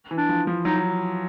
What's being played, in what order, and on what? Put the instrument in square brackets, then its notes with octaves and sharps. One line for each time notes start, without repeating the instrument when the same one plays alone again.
[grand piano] E3
[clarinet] D4
[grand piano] F3
F3
[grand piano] F#3 [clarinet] D#4